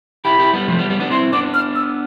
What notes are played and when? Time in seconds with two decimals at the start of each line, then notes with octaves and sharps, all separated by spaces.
0.25 E4 G4 B5
0.39 E4 G4
0.53 G3 B3
0.68 F3 A3
0.79 G3 B3
0.90 G3 B3
1.00 B3 D4
1.11 C4 E4 C6
1.33 B3 D4 D6
1.54 F6
1.75 E6